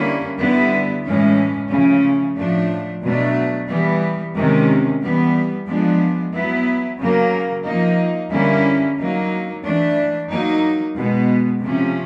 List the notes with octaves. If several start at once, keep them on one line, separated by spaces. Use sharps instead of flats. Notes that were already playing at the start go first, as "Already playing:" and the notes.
Already playing: D3 G3 A#3 C#4 E4
D3 G3 B3 E4
A2 E3 G#3 C#4
C#3 F3 A3 C#4
A2 F3 A3 D4
B2 F#3 A3 D4
E3 G3 B3
C3 D#3 G#3 C#4
E3 G3 B3
F3 G#3 B3 D4
F#3 B3 E4
C#3 F#3 A#3
F3 A#3 D#4
D3 G3 A#3 C#4 E4
F#3 A#3 D#4
E3 A3 D4
F#3 A#3 D#4
B2 G#3 B3
C3 F3 A3 C#4